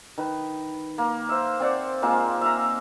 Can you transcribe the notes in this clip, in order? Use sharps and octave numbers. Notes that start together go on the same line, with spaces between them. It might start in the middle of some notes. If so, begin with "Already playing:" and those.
D#3 B4
A#3
C5 E5
C4 D5 F#5
G#3 A#3 C4 F4
E5 F5 A#5